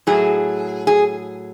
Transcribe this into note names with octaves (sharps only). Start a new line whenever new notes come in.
A2 F#3 G#4
G#4